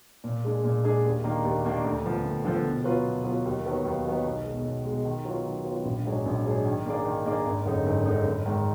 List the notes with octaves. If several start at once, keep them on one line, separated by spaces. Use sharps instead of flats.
A#2
G#3 D4 G#4
A#2
G#3 D4 G#4
D#2
D#3 A#3 D4
D#2
D#3 A#3 D4
D2
D3 F3 B3
D2
D3 F3 B3
B2
F#3 B3 F4 B4
B2
F#3 B3 F4 B4
D#2
D#3 F#3 B3
D#2
D#3 F#3 B3
B1
B2 G#3
B1
B2 G#3
D#3
F#3 B3 F4
D#3
F#3 B3 F4
A#1
G#2 F#3 D4 G#4
A#1
G#2 F#3 D4 G#4
D#3
A#3 D4 G#4 D5
D#3
A#3 D4 G#4 D5
G#1
F#2 D3 G#3 D#4
G#1
F#2 D3 G#3 D#4
G#1
G#2 D#3